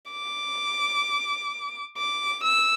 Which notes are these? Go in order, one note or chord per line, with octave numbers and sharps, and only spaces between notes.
D6
D6
E6